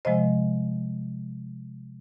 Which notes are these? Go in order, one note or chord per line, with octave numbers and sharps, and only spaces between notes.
C3 F3 G#3 C5 D#5